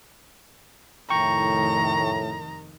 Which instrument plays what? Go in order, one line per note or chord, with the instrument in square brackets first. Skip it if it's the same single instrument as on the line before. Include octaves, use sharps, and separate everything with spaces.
[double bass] F1 D#3 [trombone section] A2 [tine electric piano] G5 C#6 [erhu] A#5